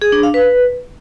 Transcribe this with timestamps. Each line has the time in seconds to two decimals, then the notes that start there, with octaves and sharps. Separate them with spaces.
0.02 G#4
0.12 D4
0.23 F5
0.34 B4